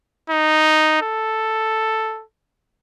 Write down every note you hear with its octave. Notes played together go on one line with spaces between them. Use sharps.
D#4
A4